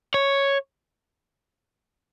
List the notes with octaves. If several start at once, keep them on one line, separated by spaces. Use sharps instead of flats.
C#5